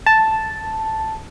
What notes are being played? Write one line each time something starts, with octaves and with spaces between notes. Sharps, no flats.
A5